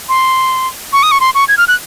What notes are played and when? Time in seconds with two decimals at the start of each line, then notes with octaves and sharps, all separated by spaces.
0.09 C6
0.93 C#6
1.03 D#6
1.12 C#6
1.20 C6
1.35 C#6
1.48 G#6
1.58 F6
1.68 F#6